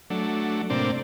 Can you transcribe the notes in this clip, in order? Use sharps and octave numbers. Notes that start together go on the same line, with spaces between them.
F#3 A3 D4
A2 C3 A#3 C4 D4 D5